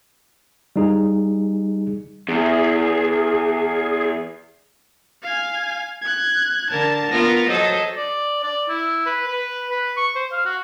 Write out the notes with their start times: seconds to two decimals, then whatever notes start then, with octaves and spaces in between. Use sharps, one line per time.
0.76 G3 D#4 G#4
2.28 E2 G#4
5.23 F5 G#5
6.01 F#6 G#6
6.71 D3 A#4 A5
7.11 B3 F4 A#4 A#6
7.48 F#3 A4 C5 D#5
7.97 D5
8.44 D5
8.69 E4
9.06 B4
9.27 B4
9.71 B4
9.97 C#6
10.16 C5
10.32 F5
10.45 F#4